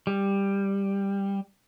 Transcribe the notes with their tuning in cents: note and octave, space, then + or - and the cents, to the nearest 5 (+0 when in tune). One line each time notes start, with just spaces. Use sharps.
G3 +10